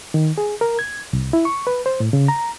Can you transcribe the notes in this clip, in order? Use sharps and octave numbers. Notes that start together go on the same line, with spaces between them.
D#3
G#4
A#4
G#6
C2
E4
C#6
B4
C5
A2
C#3
A#5